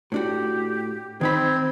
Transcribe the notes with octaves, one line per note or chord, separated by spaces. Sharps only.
A2 D4 F#4 G4
D#3 C4 D#4 B5 G#6